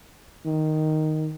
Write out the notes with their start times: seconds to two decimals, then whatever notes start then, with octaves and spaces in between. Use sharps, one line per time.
0.45 D#3